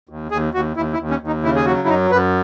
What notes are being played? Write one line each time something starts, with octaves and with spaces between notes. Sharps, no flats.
D#2
D#2 G#4
D#2 F#4
D#2 E4
E4
D#2
C#4
D#2
D#4
C#3 E4
G#4
F#3 F#4
E4
F#2 D#4
F#2 B4